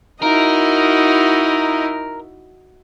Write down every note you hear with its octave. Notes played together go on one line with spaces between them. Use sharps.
D#4 E4 F#4 A#4 D#5